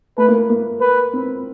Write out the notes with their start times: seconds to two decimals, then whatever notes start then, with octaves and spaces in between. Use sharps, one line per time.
0.18 A3 B4
0.28 A#3
0.49 A#3
0.81 B4
1.13 C4